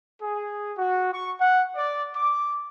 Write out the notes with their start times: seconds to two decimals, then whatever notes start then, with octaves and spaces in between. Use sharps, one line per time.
0.21 G#4
0.77 F#4
1.12 C#6
1.41 F#5
1.76 D5
2.15 D6